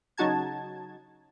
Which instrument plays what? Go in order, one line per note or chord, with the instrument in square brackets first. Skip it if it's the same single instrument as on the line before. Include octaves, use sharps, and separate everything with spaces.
[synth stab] C#3 F#3 D#4 F#4 A5 G#6